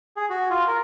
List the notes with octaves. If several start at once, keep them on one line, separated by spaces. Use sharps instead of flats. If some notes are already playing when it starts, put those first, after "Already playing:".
G#4
F#4
F4
A#4